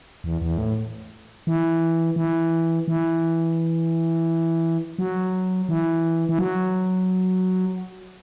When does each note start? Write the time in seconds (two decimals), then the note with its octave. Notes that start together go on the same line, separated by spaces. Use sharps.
0.24 E2
0.42 E2
0.58 A2
1.47 E3
2.16 E3
2.88 E3
4.99 F#3
5.69 E3
6.29 E3
6.39 F#3